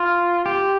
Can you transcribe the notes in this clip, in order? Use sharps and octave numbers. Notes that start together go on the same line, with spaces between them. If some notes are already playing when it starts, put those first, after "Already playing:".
Already playing: F4
G4